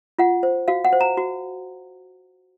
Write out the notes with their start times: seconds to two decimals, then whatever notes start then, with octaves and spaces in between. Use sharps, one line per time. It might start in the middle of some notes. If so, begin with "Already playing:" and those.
0.19 F4 F#5
0.43 C5
0.68 F#4 F5
0.85 F#5
0.93 C5
1.01 A#5
1.17 F#4